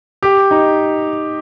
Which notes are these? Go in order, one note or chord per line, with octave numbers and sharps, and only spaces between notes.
G4
D#4